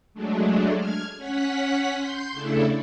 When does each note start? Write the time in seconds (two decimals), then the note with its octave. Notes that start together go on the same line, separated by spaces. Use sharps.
0.14 F#3 G#3 A3 D4
0.76 F6 G#6
1.16 C#4 F#5 B6
1.97 C6 G6
2.32 C#3 A3 D4 E4 A4